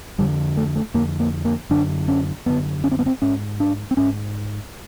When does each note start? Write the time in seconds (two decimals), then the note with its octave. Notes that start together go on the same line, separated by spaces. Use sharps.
0.18 F2 D3 G3
0.57 A3
0.76 A3
0.94 F2 D3 A#3
1.20 A#3
1.45 A#3
1.70 F#2 D3 D4
2.08 C#4
2.46 F#2 D3 B3
2.84 C#4
2.91 C4
2.99 B3
3.06 C4
3.22 G#2 C#4
3.60 D4
3.91 C4
3.97 G#2 C#4